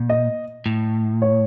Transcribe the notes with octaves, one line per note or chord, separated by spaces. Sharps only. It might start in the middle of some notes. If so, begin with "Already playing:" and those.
Already playing: A#2
D#5
A2
C#5